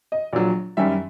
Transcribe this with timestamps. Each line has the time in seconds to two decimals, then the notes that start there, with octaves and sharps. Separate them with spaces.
0.12 D#5
0.33 A#1 A#2 F#3 D5
0.77 F#2 D#3 G3 E5